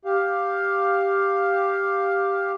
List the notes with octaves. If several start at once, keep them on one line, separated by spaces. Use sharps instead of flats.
G4 F5